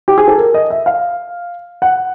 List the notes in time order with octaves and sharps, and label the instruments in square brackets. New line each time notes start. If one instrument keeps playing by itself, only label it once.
[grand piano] G4
G#4
A4
A#4
D#5
E5
F5
F#5